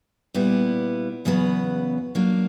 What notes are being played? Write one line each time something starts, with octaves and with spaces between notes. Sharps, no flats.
A#2 G3 B3 E4
E2 C#3 F#3 B3
F#3 A#3 D4